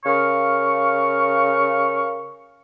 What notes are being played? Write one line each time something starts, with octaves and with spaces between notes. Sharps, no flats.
C#3 A#4 F5 C#6